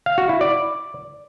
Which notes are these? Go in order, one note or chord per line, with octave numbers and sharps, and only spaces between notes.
F5
F#4
E4
D5